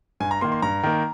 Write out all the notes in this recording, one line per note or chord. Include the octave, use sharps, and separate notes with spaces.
G2 G#5
A#5
D#3 A#3 C6
C6
G2 A#5
D#3 A#3